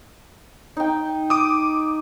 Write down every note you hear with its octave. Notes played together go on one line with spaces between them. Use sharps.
D#4 G5
D6 D#6